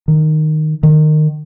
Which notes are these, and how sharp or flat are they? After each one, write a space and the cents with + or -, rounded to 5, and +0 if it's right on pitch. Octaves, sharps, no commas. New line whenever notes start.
D#3 -10
D#3 -20